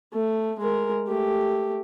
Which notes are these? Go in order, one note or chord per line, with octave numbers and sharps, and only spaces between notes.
A3
G#3 A#4
A3 G4